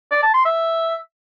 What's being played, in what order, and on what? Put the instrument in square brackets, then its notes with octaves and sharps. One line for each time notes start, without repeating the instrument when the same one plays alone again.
[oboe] D5
A5
C6
E5